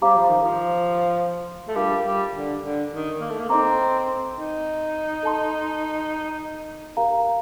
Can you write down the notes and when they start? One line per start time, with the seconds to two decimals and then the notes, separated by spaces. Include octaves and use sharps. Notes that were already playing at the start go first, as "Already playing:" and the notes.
0.02 G3 G4 C5 F5 A#5 D6
0.16 F3
0.30 D#3
0.43 F3
1.68 A3
1.75 G3 D4 F4 A#4 F5 A5
2.05 G3
2.34 D3
2.62 D3
2.92 D#3
3.21 A#3
3.30 A3
3.40 A#3
3.49 C4 D#4 A4 D#5 A#5 D6
4.37 D#4
5.23 A4 D#5 A5 C6
6.97 G4 A#4 F5 A#5